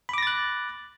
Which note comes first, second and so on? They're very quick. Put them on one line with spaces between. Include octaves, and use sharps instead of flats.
B5 D6 A#6 A6 F#6